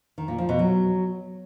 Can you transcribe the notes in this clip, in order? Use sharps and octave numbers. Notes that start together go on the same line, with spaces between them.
D#3
A#2
F3
B2
F#3